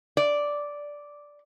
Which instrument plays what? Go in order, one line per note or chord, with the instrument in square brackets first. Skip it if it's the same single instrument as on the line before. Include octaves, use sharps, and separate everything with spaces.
[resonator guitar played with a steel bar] D5